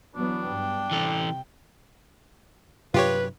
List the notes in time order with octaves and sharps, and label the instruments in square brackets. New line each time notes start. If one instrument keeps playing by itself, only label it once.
[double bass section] E3 F#3 B3 [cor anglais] D4
[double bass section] G2 [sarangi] G5
[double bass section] C3 [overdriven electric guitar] E3 A4
[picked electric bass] G2 C3 F#3 [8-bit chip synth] F4 G4 C#5 [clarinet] B4